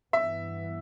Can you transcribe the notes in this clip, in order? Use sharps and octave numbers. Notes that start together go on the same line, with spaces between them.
G2 E3 B3 E5